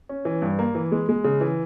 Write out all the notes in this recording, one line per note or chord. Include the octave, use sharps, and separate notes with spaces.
C#4
E3
G2
A#3
E3
G#3
G#3
C#3
E3